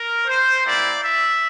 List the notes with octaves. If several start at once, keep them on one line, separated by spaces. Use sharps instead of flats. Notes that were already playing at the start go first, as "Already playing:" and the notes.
Already playing: A#4
C5
A#3 E4 G4 D5
E5